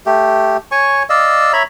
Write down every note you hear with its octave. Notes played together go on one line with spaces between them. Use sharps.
A3 G4
C#5 G#5 C#6
D5 D#5 F5 E6
C#5 E5 A#5 B5